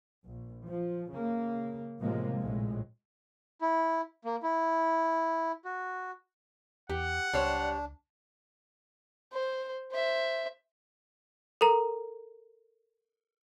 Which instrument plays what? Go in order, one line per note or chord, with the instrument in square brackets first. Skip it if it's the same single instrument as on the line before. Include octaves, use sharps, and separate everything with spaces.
[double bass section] A#1
F3
C#3 A#3
A2 C3 F3 G#3 A#3
A#1 A2 G#3
[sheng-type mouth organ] E4
A#3
E4
F#4
[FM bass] E2 [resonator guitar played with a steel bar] G4 [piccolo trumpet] F#5
[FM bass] C#2 [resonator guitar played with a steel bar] G3 C5 C#5 [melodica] D4
[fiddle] C5
C5 E5
[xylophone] A4 A#4 A#5